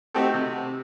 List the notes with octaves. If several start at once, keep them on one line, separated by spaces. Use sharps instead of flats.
A3 C4 D#4 F#4 G4 A4
C3